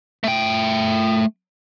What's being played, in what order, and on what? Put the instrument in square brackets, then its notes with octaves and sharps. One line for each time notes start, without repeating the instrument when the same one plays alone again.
[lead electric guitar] A3 G5